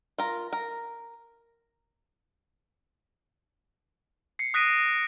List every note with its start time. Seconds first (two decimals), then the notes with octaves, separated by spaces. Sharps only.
0.18 F4 A#4
0.53 A#4
4.39 C7 C#7
4.54 D#6 F#6 A#6 B6 D7 D#7